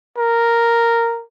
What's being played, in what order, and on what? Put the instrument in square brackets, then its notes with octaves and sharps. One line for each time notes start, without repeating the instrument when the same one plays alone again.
[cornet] A#4